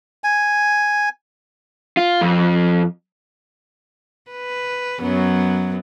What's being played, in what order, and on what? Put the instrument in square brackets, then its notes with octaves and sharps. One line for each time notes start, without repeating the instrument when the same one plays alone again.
[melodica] G#5
[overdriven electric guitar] F4
F2
[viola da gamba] B4
F#2 F#3 B3